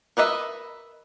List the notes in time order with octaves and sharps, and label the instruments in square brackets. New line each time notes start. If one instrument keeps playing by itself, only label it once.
[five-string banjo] A#4 B4 D#5 E5